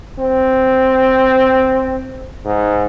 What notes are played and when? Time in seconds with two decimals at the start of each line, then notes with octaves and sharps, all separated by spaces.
0.19 C4
2.45 G#2